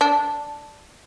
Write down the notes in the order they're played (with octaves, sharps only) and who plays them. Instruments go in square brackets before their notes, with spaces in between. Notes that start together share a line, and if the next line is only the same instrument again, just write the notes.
[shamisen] D4